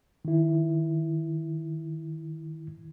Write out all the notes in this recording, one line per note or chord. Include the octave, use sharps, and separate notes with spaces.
D#3 E4